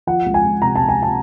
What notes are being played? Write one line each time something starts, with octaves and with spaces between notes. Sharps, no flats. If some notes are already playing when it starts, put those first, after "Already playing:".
F3 F#5
C#2
G#5
C#2
C3 A#5
C#2 A5
G#5
A5